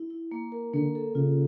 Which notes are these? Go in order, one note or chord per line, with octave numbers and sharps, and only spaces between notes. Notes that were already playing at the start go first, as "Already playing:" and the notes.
Already playing: E4
E4
A#3
A#4
D3 A#3
A4
C#3 F4